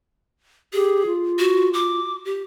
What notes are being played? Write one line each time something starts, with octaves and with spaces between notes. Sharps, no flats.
G4 G#4
F4
F#4
D6
G4